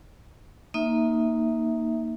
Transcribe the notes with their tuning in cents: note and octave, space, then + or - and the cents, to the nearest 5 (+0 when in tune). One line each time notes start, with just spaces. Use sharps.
A#3 +0 D#4 +0 E5 -20